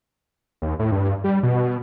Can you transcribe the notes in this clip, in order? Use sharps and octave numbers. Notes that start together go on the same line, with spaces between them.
D#2
A2
G2
G3
B2